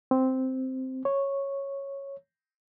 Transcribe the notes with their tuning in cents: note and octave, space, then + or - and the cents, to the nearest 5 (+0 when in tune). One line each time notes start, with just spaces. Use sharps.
C4 -5
C#5 -5